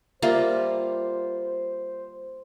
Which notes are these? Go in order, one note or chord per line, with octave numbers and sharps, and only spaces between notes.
G3 A#3 F4 A#4 C5 E5